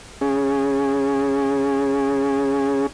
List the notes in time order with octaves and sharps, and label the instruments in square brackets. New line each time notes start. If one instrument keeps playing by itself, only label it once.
[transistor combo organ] C#4 G#4